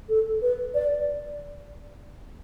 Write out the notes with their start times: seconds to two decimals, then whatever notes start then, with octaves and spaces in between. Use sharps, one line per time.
0.09 A4
0.42 B4
0.74 D5